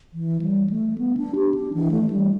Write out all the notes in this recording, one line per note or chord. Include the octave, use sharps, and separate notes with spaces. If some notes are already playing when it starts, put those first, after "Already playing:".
E3
G3
A3
B3
D4
G4
D4
E3
A3
G3